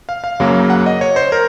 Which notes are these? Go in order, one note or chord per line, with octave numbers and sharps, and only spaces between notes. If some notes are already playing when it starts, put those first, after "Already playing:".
F5
F5
F#2 C#3 F#3 A#3
F#5
D#5
C#5
C5
A#4